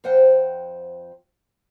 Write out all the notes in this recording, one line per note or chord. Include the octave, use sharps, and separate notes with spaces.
F2 F3 C5 F#5 G5